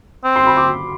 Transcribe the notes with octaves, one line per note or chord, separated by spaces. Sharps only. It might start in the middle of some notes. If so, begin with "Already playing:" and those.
C4
C6
B5
D6